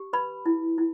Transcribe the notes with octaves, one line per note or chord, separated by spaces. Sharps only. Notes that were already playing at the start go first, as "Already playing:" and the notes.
Already playing: G4
B4 B5
E4
E4